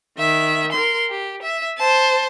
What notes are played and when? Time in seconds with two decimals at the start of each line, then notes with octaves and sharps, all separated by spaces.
0.17 D#3 E5
0.72 A#4 C6
1.10 G4
1.43 E5
1.78 C5 A5